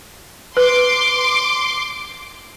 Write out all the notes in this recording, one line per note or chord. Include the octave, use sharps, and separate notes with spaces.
B4 C6 D6